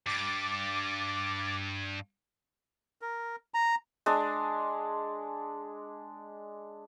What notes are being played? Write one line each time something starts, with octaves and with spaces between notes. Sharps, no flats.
G2 D6 A6
A#4
A#5
G#3 D4